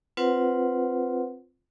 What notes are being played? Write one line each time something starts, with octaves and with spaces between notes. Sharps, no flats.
C4 F4 B4 C5 F#5